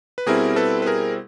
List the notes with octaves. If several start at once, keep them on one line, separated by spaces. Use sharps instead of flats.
B4
B2 G3 C4 E4 G#4 A#4
A4 B4
B4
G#4 A#4